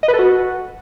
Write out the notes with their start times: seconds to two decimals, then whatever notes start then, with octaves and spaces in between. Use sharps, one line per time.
0.03 D#5
0.08 B4
0.14 A4
0.19 F#4